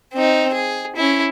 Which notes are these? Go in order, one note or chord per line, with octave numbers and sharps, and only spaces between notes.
C4 D#4
G#4
C#4 E4